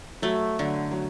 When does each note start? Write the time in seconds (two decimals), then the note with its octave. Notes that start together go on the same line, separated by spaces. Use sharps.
0.22 F#3 A3
0.59 D3 F#3
0.91 F#3